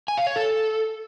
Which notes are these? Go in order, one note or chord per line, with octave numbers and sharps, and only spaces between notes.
G#5
F5
C#5
A4